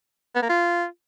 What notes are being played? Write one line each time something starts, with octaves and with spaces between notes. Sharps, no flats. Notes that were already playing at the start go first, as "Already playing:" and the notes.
B3
A#3
F4